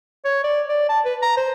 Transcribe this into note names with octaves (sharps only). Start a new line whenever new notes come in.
C#5
D5
D5
A5
B4
A#5
C5